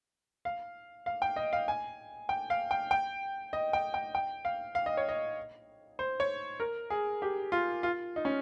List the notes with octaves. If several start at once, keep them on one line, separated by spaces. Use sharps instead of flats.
F5
F5
G5
D#5
F5
G#5
G5
F5
G5
G5
D#5
G5
G5
G5
F5
F5
D#5
C#5
D#5
C5
C#5
A#4
G#4
G4
F4
F4
D#4
C#4